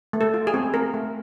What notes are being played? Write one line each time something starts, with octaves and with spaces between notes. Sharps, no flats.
A3
A4
F4
G#4
C4
A3 A#4
A3